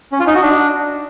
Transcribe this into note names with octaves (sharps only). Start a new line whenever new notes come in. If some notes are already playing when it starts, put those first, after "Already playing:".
C#4
F4
D#4
F#4
D4